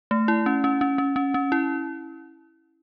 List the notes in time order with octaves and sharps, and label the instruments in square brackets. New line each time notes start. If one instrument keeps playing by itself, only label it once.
[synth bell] A3
E4
C#4
C#4
C#4
C#4
C#4
C#4
E4